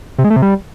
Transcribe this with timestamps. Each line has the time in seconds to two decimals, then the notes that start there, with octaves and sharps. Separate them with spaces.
0.18 C3
0.24 G#3
0.30 A3
0.36 C3
0.42 G3